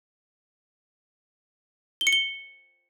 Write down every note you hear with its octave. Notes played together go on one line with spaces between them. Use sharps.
G7
C#7
G7